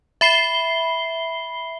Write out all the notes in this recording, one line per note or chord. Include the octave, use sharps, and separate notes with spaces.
E5 B5 C7 G7